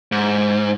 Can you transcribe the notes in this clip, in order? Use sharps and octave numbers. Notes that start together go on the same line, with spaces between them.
G#2